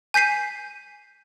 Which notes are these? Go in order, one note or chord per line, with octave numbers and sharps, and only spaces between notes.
G#5 G6 B6 C7 D#7